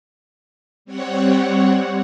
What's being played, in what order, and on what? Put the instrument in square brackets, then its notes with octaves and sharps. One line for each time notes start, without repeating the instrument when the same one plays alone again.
[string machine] G3 C4 C#5 F#5